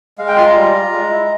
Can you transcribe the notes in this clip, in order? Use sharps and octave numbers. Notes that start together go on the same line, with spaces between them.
G#3 F5
G5
F4 C6
A#5
G3
F4
G#3
E4